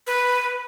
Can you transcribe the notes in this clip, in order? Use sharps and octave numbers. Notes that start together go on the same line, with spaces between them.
B4